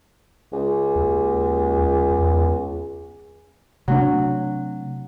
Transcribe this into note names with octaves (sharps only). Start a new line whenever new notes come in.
C#2
D#2
E2
C3 F#3 A3 D4